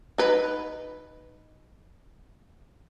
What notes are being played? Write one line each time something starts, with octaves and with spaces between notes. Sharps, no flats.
D#4 B4